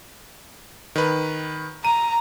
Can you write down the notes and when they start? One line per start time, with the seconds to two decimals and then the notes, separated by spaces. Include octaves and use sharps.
0.96 D#3 B4
1.85 A#5 D#7